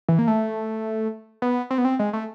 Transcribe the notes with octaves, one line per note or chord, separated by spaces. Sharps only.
E3
A#3
A3
B3
C4
B3
C4
G#3
A3